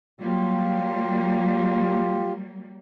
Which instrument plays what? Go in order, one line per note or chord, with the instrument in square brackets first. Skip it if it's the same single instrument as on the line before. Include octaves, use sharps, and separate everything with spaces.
[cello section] F#3 G3 A#3 [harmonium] F4 G4